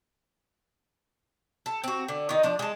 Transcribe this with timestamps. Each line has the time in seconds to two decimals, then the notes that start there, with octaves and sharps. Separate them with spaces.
1.66 A4
1.84 C4 F#4
2.08 D3
2.29 D#3 D#4
2.43 F3 D4
2.59 G#3 A5